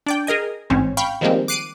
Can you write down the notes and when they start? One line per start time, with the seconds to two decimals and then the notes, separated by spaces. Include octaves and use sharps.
0.06 D4 D5 G5
0.27 G#4 A#4 D#5 G#5
0.70 A1 G#2 C4 C#4
0.97 F5 G5 B5 C#6
1.21 D#3 F3 G3 G#3 A#3 C4
1.48 D6 F#6 C7 D7 D#7